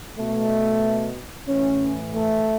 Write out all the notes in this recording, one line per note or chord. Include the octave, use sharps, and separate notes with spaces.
B2 A3
A2 E3 C#4
A3